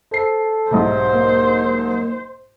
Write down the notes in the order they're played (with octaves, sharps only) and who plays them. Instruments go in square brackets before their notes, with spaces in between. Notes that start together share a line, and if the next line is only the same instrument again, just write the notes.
[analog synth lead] A4 [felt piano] C5 C7
[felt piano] B1 G#2 C3 [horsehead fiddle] C5
[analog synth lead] A#3